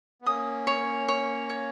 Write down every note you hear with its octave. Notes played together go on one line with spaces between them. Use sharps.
B3
A#3 C#4 D#6
C#5
C#5
C#5